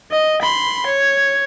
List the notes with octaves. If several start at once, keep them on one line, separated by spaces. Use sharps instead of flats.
D#5
B5 C6
C#5